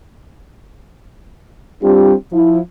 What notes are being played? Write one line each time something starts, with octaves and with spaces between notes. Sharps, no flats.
G3 C4 D4 F4 G4
F3 E4